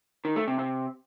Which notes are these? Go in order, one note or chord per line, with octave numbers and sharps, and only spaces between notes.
D#3
A3
C3
C3